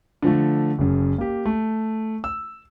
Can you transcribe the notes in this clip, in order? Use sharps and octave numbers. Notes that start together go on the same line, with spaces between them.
D3 F3 A3
F#1 F#2
A#3 G4
A3
E6